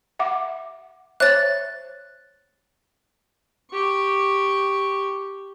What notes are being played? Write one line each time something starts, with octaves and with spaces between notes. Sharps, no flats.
E5 F#5 D6
C5 C#5 E5 F#6 A6
G4 C#6